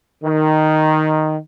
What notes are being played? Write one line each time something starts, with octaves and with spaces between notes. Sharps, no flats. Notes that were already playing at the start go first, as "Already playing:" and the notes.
D#3